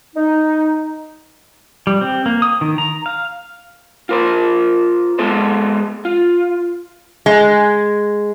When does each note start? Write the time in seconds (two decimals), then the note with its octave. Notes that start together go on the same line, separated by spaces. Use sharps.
0.15 D#4
1.87 G3
2.01 C4
2.26 A#3
2.42 D#6
2.61 D#3
2.78 A#5
3.06 F5
4.09 F4 A#4 C5
5.19 G#3 B3 G#4 A4 C5
6.05 F4
7.26 G#3